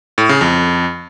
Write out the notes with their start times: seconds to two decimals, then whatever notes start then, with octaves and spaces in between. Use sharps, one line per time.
0.18 A2
0.29 C#3
0.41 F2